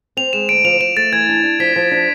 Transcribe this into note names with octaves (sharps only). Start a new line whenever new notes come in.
C4 F7
G#3 E7
D2 D7
F3 F7
F3 E7
A3 A6
E3 G#6
D4
D4
F3 B6
F3
D4